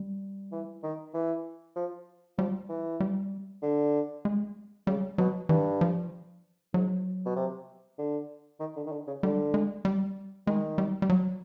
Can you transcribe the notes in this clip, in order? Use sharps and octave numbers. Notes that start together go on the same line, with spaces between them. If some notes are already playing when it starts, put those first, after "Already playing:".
Already playing: G3
E3
D#3
E3
F3
F3 G3
E3
G3
D3
G#3
C#3 G3
B2 F#3
G2 E3
F3
G#2 F#3
B2
C3
D3
D#3
D3
D#3
D3
C#3
D3 G3
G#3
G3
D#3 G#3
G3
G3
F#3